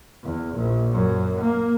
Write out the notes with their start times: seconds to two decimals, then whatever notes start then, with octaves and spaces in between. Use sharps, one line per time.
0.25 E2
0.56 A#1
0.94 F#2
1.41 A#3